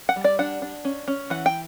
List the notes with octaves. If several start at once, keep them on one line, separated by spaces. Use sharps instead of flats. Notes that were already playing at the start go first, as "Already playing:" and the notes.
F#5
G3
D5
D4 F#5
D4
C#4
C#4
E3 F#5
G5